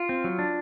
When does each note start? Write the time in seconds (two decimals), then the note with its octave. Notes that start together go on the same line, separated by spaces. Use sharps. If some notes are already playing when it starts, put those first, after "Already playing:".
Already playing: F4
0.09 C4
0.24 F#3
0.39 D4